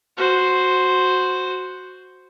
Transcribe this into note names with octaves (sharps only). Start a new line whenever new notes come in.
F#4 C5